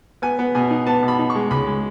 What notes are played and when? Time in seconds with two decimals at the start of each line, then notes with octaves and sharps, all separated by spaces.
0.22 B3 G#5
0.39 B3
0.55 B2 G#5
0.71 D#4
0.86 B3 A5
1.03 B2
1.08 B5
1.19 D#4
1.30 C#6
1.35 G#3
1.51 C#2 B5
1.67 G#3